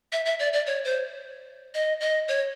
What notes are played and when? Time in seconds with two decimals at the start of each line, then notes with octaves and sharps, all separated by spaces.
0.12 E5
0.25 E5
0.39 D5
0.53 D5
0.66 C#5
0.84 C5
1.74 D#5
2.00 D#5
2.28 C#5